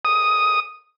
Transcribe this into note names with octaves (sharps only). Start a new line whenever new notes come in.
D#6